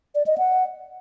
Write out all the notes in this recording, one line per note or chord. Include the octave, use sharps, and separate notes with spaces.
D5
D#5
F#5